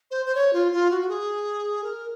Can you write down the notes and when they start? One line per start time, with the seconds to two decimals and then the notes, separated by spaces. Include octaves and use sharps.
0.11 C5
0.26 C5
0.35 C#5
0.53 F4
0.72 F4
0.91 F#4
1.01 F#4
1.09 G#4
1.84 A#4